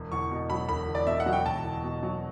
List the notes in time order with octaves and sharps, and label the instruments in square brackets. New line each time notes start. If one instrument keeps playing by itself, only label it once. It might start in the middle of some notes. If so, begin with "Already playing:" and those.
Already playing: [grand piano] E1
[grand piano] E2 [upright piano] C#6
[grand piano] B2
[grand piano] F#3 [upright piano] B5
[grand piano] E1 [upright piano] B5
[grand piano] E2
[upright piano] D5
[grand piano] B2 [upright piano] E5
[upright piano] F#5
[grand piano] F#3
[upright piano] G5
[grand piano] E1 [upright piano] A5
[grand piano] E2
B2
F#3